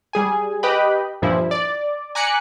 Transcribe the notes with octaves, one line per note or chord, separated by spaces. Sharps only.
G3 G#4 G#5
G4 B4 D#5 G5 B5
G2 A#2 F3 E4
D5
G#5 A#5 D6 F#6 B6 C#7